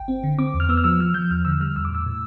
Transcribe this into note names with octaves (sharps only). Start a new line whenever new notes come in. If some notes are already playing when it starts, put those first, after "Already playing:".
Already playing: G1 G5
C4
D3
C4 D6
E2
F6
B3 E6
F6
F3 E6
F3 F6
F3 G6
E2 F6
D3 E6
G3 F6
E2 E6
D6
A2 E6
A2